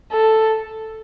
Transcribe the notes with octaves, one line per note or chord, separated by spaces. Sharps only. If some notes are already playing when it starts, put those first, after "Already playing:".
A4